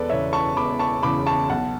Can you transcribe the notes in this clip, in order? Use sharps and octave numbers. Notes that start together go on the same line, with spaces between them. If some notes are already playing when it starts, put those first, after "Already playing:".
Already playing: E1 A4 B4 D5
E2 C#3 C#5 E5
A5 C#6
E1 B5 D6
A5 C#6
E2 C#3 B5 D6
A5 C#6
B1 F#5 A5